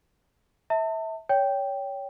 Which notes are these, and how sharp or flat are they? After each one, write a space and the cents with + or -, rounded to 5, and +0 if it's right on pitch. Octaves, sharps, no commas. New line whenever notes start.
E5 -25 A5 +35
C#5 +20 G5 +0